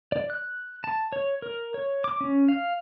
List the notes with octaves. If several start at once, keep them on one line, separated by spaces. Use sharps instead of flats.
D5
F#6
A5
C#5
A#4
C#5
D6
C#4
F5